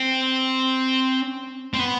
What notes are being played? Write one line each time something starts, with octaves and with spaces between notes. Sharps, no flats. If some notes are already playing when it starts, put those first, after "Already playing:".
Already playing: C4
C4
B3